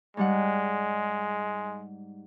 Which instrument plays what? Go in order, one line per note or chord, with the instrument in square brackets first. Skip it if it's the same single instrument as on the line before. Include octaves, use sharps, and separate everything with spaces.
[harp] G#2 G3 F#5 [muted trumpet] G#3